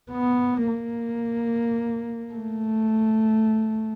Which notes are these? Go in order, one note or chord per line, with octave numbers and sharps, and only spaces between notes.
B3
A#3
A3